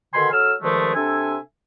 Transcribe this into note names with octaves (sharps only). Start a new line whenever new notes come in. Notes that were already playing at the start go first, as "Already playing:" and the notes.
B2 D3 D#3 G#5 B5 C6
F#3 A4 E6 F6
G2 D#3 F3 G#3 A3
C3 D4 A4 E5 G#5